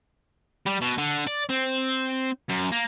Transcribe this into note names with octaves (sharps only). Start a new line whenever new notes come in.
G3
B2
D3
D5
C4
F#2
A#3